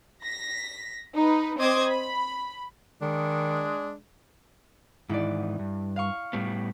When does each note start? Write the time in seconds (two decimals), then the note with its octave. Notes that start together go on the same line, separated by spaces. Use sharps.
0.24 A#6 B6
1.15 D#4 B4
1.58 C4 C5 D#5 D6 D#6 G#6
1.88 B5
3.02 D#3 G#3 D4
5.09 G#2 D#3 E3 E4 D5
5.59 G2
5.96 F5 C#6
6.33 A2 G3 B3